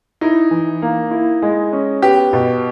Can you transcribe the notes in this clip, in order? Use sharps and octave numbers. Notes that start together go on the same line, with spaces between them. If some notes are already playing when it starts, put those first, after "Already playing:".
D#4 E4
E3
A#3
E4
G#3
C#4
B3 G4
B2